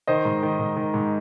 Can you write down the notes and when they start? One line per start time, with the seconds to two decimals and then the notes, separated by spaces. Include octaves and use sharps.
0.07 D#3 C5 D#5
0.25 G#2
0.43 D#3
0.59 G#2
0.76 D#3
0.94 G#2